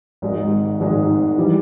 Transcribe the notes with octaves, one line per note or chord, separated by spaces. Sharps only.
G#1 G#2 D#3 G#3
G#1 G#2 D#3 G#3
E3 G3